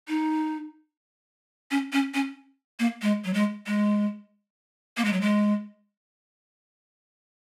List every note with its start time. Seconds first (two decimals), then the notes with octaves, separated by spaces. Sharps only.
0.08 D#4
1.71 C#4
1.93 C#4
2.14 C#4
2.79 A#3
3.02 G#3
3.25 F#3
3.34 G#3
3.67 G#3
4.97 A#3
5.05 G#3
5.13 F#3
5.21 G#3